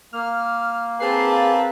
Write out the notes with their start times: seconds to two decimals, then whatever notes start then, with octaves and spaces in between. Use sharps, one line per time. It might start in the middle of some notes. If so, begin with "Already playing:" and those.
0.13 A#3 F6
1.00 C4 G#4 A#4 B4 A5 C7
1.32 F5